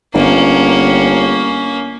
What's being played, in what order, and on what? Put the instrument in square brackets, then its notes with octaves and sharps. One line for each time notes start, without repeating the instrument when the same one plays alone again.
[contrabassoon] G1 [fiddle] A#3 C#4